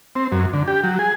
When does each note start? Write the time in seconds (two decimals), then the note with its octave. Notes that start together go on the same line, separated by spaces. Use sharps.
0.15 C4
0.32 F#2
0.53 D3
0.68 G4
0.84 F#3
0.99 G#4